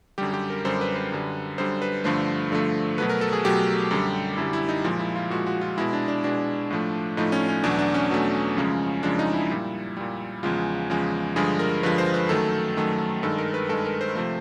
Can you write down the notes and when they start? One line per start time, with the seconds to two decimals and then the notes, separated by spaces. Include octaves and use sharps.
0.18 F#2 D3 G3 G4
0.34 G4
0.50 A#4
0.65 F#2 D3 G3 C5
0.81 B4
0.96 B4
1.12 F#2 D3 G3
1.58 F#2 D3 G3 C5
1.82 B4
2.04 G2 D3 F3 A3 C5
2.51 G2 D3 F3 A3
2.98 B2 F#3 A3 B4
3.10 A#4
3.21 A4
3.33 G#4
3.45 B2 F#3 A3 G4
3.91 F#2 D3 G3
4.37 F#2 D3 G3 E4
4.53 E4
4.69 D#4
4.84 A#2 F3 G#3
4.99 E4
5.16 F4
5.30 A#2 F3 G#3 F#4
5.47 F#4
5.61 F4
5.78 B2 G#3 E4
5.93 D4
6.08 D4
6.24 B2 G#3 D4
6.71 A2 F3 A3
7.17 A2 F3 A3 D#4
7.32 C#4
7.49 C#4
7.64 E2 B2 F#3 A3 D4
7.79 D4
7.94 C#4
8.10 E2 B2 F#3 A3
8.57 F#2 C#3 F3 G#3
9.03 F#2 C#3 F3 G#3 D4
9.19 D#4
9.34 E4
9.50 A#2 G3
9.97 A#2 G3
10.43 E2 C#3 F3 G#3 F4
10.90 E2 C#3 F3 G#3
11.36 G2 D3 F3 G#3 G#4
11.59 A#4
11.83 G2 D3 F3 G#3 B4
11.98 C5
12.14 B4
12.29 F#2 D#3 F#3 A3 A4
12.77 F#2 D#3 F#3 A3
13.23 G2 D#3 G#3 A4
13.38 A#4
13.54 B4
13.69 G2 D#3 G#3 A4
13.85 A#4
14.01 C5
14.15 C3 F3 A3